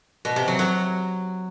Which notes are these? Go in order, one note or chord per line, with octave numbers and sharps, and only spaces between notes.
B2
C3
F#3
F#3